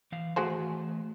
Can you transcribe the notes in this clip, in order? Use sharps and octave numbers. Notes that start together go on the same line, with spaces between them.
E3 F5
E3 A3 F#4 G#4 C5